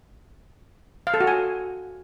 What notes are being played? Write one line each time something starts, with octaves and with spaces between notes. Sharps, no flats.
F5
A4
F#4
G#5